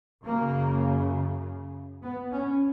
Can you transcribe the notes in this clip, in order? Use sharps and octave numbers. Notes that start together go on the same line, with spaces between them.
F#2 C#3 A#3
B3
C#4